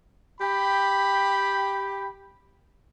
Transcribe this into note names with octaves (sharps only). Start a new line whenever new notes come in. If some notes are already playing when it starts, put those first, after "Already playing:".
G4 G5 B5